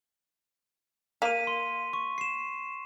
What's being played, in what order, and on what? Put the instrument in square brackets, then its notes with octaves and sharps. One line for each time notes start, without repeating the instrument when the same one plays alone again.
[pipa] A#3 [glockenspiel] B6 D#7
[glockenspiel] C6
C#6
C7 E7